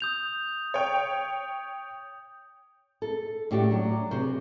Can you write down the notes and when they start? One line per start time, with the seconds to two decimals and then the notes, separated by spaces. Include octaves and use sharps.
0.01 D#6 G6 F7
0.74 C#5 G5
3.02 A4
3.51 A2 D4 F#4 G4
3.71 F#3 D4
4.11 C3 F#4 G#4 C5